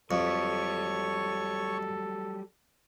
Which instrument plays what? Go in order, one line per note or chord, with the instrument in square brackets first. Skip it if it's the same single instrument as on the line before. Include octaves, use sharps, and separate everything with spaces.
[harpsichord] F2 [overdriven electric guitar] F#3 G3 [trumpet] A4 [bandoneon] C#5 C#6